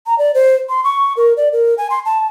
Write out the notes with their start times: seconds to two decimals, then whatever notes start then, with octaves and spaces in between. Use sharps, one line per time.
0.07 A#5
0.18 D5
0.35 C5
0.69 C6
0.84 C#6
1.17 A#4
1.37 D5
1.53 A#4
1.78 G#5
1.90 C6
2.05 A5